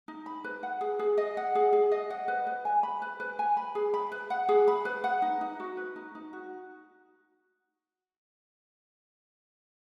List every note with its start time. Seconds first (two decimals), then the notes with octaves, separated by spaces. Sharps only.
0.08 D#4
0.26 B5
0.44 B4
0.63 F#5
0.81 G#4
0.99 G#4
1.18 D#5
1.37 F#5
1.55 G#4
1.73 G#4
1.92 D#5
2.10 F#5
2.28 B4
2.47 B4
2.65 G#5
2.83 B5
3.02 B4
3.20 B4
3.39 G#5
3.57 B5
3.75 G#4
3.94 B5
4.12 B4
4.30 F#5
4.49 G#4
4.68 B5
4.85 B4
5.04 F#5
5.22 D#4
5.41 D#4
5.60 F#4
5.77 B4
5.96 D#4
6.15 D#4
6.33 F#4